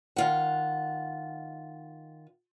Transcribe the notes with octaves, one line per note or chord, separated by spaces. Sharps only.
D#3 F4 F#5